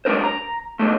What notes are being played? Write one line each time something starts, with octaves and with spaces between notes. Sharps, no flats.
G3 G#3 D4 A#4 C5
A#5
B2 D3 G#3 A3